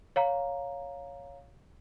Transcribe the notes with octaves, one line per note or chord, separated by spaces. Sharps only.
C#5 F5 A#5